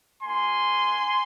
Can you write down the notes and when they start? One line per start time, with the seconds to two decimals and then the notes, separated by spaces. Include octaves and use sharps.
0.23 A#3 D#4 F#4 G#5 C6